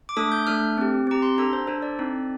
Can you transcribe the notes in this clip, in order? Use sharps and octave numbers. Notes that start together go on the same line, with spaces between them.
D6
A3 D4 A4 D#6
G6
A3 D4 A4 F6
C4 G4
C4 G4 A#5
C6
D4 A4 A#5
C5
D4 A4 C5
D5
C4 D#4 A4